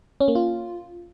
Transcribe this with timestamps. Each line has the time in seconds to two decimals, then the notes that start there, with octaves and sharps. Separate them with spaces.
0.20 C#4
0.28 A#3
0.35 F4